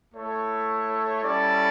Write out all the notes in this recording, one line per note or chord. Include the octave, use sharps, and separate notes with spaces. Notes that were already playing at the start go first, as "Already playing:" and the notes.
A3 E4 A4 C#5
G3 C#4 E4 A4 D5